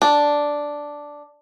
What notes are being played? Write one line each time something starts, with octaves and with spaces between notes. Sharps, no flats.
D4